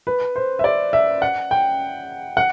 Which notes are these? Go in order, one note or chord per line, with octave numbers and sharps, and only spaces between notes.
B4
C5
E5
D5
E5
F#5
G5
F#5